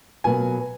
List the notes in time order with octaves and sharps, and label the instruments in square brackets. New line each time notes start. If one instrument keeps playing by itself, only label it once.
[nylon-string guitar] B2 F#3 A#3 F4 B4 [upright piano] G#5